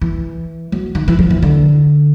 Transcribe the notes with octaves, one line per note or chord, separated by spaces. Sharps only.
E3
F#3
D#3
E3
F3
E3
D3